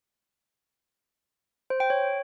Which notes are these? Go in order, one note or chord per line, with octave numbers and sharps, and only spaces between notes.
C5
G5
C#5